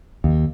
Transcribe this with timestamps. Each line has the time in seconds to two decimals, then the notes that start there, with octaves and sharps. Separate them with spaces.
0.24 D#2